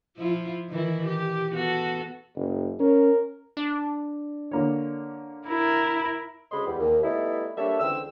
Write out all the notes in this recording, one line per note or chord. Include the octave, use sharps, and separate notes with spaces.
F3 E4 F4
D#3 E3 E4
G4
B3 F#4 A4
F#1
C#4 A#4
D4
D3 A#3 C#5
E4 A#4
D2 C#3 G#3 D#5 B5 C6
E2 G3 B3
D#2
G3 A3 B3 D#4 E4
G3 A#3 D4 A4 C#5 E5
C#2 D3 E3 C4 E6